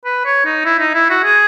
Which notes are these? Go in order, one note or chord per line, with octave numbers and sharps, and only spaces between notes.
B4
C#5
D#4
E4
D#4
E4
F#4
G#4